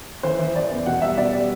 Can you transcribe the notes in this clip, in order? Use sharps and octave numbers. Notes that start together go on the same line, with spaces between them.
E3 C5
E3
E3 D5
E2
B2 F#5
G3 E5
B2 D5
G3 D5